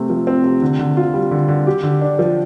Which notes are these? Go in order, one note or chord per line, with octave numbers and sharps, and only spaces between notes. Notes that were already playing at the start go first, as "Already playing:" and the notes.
Already playing: C3 A3 C4
F3
C4
C3
D3
D3
F4
G3
D3
D3
G4
D3
D4
F3